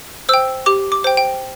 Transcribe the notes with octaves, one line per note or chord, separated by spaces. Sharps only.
C5 G5 E6
G4 D6
D6
C5 G5
G5